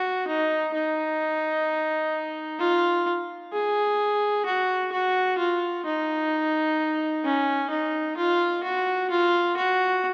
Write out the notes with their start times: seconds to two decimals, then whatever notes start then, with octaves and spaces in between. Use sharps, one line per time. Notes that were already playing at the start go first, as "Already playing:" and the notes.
Already playing: F#4
0.27 D#4
0.74 D#4
2.59 F4
3.53 G#4
4.45 F#4
4.92 F#4
5.38 F4
5.85 D#4
7.24 C#4
7.70 D#4
8.17 F4
8.63 F#4
9.11 F4
9.57 F#4